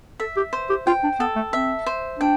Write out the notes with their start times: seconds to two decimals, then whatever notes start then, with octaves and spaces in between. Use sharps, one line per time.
0.20 A4 E5
0.37 G4
0.53 C5
0.69 G4
0.87 F4 G5
1.04 D4
1.20 B3 A4
1.36 A3
1.53 C4 E5
1.87 C5
2.19 D4 G5